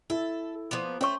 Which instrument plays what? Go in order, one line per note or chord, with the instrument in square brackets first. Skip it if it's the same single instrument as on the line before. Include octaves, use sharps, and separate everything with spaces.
[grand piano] E4 [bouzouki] A4
[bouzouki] F3 A#3 B3
[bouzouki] A3 C5 [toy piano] C#4 C#5 C#6